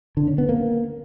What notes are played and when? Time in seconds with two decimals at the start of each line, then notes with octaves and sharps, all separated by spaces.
0.17 D3
0.28 C#4
0.38 B3
0.49 A#3